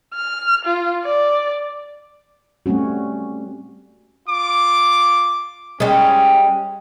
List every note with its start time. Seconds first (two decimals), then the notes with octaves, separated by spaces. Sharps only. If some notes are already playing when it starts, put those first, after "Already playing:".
0.14 F6
0.65 F4
1.04 D5
2.66 G3 A3 C4 C#4 F#4
4.29 F4 D6
5.80 G3 G#3 C#4